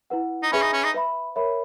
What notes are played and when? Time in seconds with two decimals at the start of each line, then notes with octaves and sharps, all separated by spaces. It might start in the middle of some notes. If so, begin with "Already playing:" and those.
0.10 E4 B4 F#5
0.43 D#4
0.51 C#4 G#4 B4 E5 G#5 B5
0.62 D#4
0.73 C#4
0.83 D#4
0.94 B4 E5 B5
1.36 A#4 C#5 E5 B5